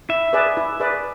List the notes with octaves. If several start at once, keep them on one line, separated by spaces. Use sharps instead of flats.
E4 E5
G#4 B4 D5
E4
G#4 B4 D5